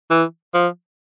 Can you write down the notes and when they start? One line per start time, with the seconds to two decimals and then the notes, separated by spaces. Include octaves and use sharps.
0.10 E3
0.54 F3